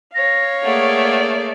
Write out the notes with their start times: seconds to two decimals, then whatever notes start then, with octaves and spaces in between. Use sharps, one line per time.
0.14 C#5 F5 A#6
0.64 A3 A#3 G#4 D5 F#5